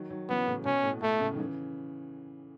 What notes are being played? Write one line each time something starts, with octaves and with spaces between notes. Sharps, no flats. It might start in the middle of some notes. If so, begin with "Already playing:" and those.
Already playing: D#3 F#3
D#3 F#3
C#3 E3 B3
A2 C#3
B2 C#4
A2
A2 A3
A2 C#3
D#3
C#3 E3